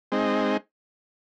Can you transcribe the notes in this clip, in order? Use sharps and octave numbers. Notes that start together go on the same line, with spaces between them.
G#3 C4 D#4